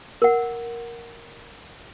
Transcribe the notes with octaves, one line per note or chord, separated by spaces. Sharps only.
A#4 F#5